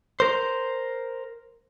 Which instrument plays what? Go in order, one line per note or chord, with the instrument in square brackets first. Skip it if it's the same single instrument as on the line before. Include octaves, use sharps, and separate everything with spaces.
[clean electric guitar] A#4 C5